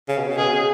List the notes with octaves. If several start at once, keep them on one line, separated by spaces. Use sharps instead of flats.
C#3
B2
C#3
B2 G#4
C#3